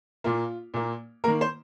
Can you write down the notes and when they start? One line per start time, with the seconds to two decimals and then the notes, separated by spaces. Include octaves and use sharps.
0.24 A#2 A#3 F4
0.74 A#2 A#3
1.24 D#3 A#3 A#4
1.41 C5